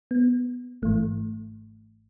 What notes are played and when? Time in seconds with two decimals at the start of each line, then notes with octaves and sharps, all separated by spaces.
0.11 B3
0.82 G#1 G#2 E3 A3